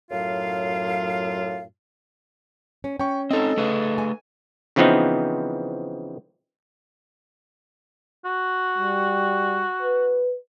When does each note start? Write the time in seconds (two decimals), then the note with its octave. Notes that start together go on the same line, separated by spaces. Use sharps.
0.11 F#2 A2 F#3 F4 F5
2.84 C#4
2.99 C#4 G5 C#6
3.31 C4 D#4 A4 D#5
3.57 A3 G#4 B4
3.98 G#5
4.76 C#3 E3 F3 B3 C4 D#4
8.25 F#4
8.78 G3
9.82 B4